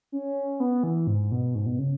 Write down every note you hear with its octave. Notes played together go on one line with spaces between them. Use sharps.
C#4
B3
E3
G#2
B2
G#2
B2
C#3